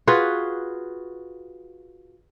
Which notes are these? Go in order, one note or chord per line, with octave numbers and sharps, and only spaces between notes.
F4 F#4 G#4 B4